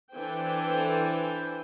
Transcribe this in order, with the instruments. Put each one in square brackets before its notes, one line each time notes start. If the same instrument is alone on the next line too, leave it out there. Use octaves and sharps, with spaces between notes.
[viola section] E3 D4 A4 C5 G5 G#5